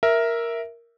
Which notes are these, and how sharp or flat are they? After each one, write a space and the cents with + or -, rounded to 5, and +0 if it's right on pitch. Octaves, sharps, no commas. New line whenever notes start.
A#4 +0 E5 +0